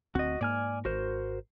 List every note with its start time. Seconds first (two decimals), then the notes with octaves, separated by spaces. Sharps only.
0.15 D1 D2 C4 F#4 D#5
0.41 G#2 A#3 D5 G#5 F6
0.85 G#1 F#4 A#4 C5